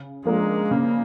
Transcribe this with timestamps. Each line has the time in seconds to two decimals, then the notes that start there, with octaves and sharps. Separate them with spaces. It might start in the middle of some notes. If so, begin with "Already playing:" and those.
Already playing: C#3
0.25 F3 G#3 A#3 D4 F4
0.71 C#3 A#3